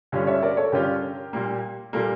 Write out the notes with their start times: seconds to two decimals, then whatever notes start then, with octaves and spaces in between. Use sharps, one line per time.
0.12 G2 D3 G3 C#4 F4
0.27 C#5 E5
0.43 A#4 D5
0.57 A4 C#5
0.72 G2 D3 G3 C#4 F4 G4 A#4
1.33 A#2 G3 A#3
1.93 A#2 G3 A#3 F4 A4